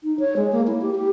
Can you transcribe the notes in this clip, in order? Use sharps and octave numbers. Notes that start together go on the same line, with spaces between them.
D#4
C#5
G#3
A#3
E4
G4
G4